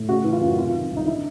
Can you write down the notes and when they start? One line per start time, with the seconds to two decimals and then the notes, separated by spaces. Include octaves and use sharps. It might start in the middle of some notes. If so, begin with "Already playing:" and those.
Already playing: A2
0.08 C#3 F#4
0.24 E3
0.33 F4
0.41 F#2
0.47 F#4
0.57 C3 F4
0.74 D#3
0.90 C2
0.97 D#4
1.06 D3 E4